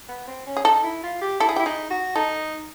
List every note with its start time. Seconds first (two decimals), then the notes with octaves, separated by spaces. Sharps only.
0.08 B3
0.27 C4
0.46 C#4
0.57 G#4
0.65 D#4 A4
0.84 E4
1.03 F4
1.21 G4
1.40 E4 A4
1.49 G#4
1.56 E4 G4
1.66 D#4 G#4
1.90 F#4
2.15 D#4 A4